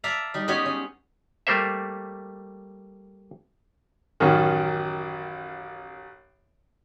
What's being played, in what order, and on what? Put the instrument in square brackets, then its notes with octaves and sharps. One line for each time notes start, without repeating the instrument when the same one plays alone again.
[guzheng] D5 E5 F5 A5 A#5
G3 D#4
G3 G#3 B3 C#4 G4 G#4
C#4
[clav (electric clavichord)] G3 A3 A#3 C5 E5
[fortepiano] A1 F#2 D#3